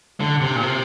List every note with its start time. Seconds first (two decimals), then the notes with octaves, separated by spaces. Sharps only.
0.20 D3
0.41 C3
0.55 A#2
0.62 C3